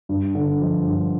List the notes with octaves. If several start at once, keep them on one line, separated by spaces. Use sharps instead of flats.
G2
D3
F3
G2